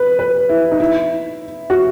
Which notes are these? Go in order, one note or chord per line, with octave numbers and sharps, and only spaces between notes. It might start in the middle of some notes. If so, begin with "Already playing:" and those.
Already playing: B4
B4
E4
D#4
E4
F#4